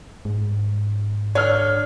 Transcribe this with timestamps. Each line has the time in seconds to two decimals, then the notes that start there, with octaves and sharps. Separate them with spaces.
0.25 G#2
1.35 D3 C#5 F6